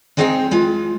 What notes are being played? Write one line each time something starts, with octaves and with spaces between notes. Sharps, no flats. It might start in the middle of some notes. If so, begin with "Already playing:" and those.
G#3 C4 D#4 G#4 C5 G5
G#3 F4